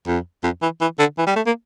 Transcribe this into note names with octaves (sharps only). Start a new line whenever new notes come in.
F2
F2
E3
E3
D3
E3
G3
A3
A#3